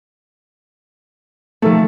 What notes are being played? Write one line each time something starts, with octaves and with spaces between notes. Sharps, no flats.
D#3 F3 A3 A4